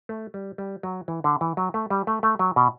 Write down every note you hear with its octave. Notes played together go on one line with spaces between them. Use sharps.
A3
G3
G3
F#3
E3
D3
E3
F#3
A3
G3
A3
A3
F#3
B2